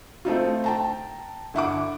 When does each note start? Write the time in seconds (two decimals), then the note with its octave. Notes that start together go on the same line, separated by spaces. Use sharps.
0.25 A3 C4 D#4 F4
0.64 G5 A5 A#5
1.54 G1 E4 F#5 D6